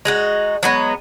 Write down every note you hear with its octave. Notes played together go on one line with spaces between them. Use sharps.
G#3 D#4 F#4
F#3 G#3 B3